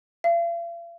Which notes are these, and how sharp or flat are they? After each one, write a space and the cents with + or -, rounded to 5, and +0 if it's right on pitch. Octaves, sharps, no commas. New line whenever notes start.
F5 -45